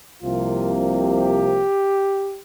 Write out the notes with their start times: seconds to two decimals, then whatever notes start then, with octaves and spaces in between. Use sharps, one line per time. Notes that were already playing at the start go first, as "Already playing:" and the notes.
0.23 C2 C3 F3 A#3 F4
0.93 G4